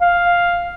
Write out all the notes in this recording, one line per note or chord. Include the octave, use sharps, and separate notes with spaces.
F5